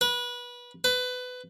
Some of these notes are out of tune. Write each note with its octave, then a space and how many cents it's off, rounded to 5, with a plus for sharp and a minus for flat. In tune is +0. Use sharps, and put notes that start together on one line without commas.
B4 -25
B4 +20